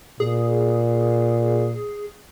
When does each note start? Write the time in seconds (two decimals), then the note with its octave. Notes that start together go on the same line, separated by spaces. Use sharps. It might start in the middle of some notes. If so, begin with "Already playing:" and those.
0.20 A#2 G#4